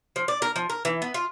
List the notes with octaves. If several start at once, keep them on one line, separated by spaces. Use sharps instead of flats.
F3
D5
A#4
F3
A#4
E3
B3
F4